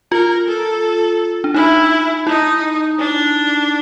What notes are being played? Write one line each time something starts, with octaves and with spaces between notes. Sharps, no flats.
F4 A#4
A4
D4
D#4 E4
D#4 E4
D4